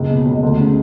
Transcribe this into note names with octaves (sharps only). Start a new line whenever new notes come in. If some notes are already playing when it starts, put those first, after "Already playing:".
Already playing: F#1 C#2
B2
C#2
D2
C#3